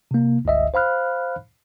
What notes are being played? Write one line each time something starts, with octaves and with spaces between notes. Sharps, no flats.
C3 A#3
G1 C#2 D#5 E5
C5 F5 B5 F6 F#6